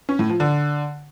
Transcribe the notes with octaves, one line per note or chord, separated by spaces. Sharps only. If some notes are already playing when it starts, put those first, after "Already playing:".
C#4
A2
F3
D3